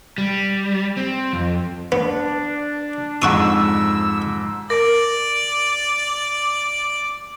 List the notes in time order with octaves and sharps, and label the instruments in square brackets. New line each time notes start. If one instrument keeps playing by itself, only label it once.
[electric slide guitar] G3
C4
F2
[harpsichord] B3 [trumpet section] D4
[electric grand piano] F2 G#2 [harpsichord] F#5 C#6 D#6 [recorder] E6
[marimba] A#4 [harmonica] D5 [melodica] D6